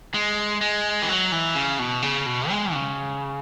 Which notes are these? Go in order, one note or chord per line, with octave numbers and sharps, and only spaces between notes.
G#3
G#3
E3
F#3
E3
C#3
B2
C#3
B2
G#3
C#3